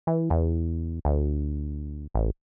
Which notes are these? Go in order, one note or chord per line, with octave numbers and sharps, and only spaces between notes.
E3
E2
D2
A1